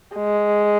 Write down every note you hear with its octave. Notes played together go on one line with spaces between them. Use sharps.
G#3